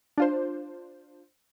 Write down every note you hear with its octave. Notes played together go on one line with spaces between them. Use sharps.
D4 F4 C5